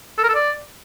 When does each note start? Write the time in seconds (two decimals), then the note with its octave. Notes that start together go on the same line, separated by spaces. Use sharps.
0.18 A4
0.23 A#4
0.29 A4
0.34 D5